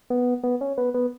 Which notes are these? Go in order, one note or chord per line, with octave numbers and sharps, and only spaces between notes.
B3
B3
C#4
B3
B3